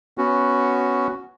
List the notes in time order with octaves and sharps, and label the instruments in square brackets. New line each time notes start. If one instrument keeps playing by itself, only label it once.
[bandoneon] B3 C#4 F#4